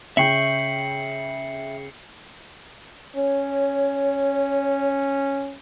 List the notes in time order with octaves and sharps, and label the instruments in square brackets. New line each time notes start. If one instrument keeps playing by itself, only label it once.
[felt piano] C#3 G5 [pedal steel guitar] E5 C#6 G6 [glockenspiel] C7 C#7 F#7
[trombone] C#4 [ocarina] C#5